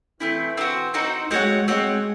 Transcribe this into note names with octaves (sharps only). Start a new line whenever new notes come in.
E3 A3 C4 E4
C4 D#4 F#4 C5
C4 D#4 F#4 C5
G#3 C4 F#4 C#5 F#5
G#3 C4 F#4 C#5 F#5